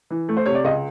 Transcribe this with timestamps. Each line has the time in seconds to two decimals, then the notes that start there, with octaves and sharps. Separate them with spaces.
0.10 E3
0.29 A3
0.37 C5
0.46 C3 C#5
0.55 D5
0.64 C#2 D#5